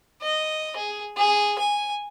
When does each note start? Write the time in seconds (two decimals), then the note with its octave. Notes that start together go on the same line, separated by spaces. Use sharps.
0.22 D#5
0.76 G#4
1.17 G#4
1.58 G#5